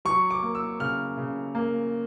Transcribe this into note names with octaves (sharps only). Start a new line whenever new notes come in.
F#3 C#6
D6
A#3
E6
C#3 F6
C#3
A#3